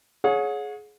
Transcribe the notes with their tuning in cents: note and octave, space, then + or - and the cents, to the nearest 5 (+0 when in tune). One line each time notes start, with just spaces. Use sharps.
G#4 +20 C#5 +0 F#5 -40